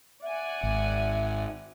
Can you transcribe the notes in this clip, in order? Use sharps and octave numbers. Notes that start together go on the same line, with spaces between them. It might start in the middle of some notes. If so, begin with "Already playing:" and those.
D5 E5 F#5 G#5
G#1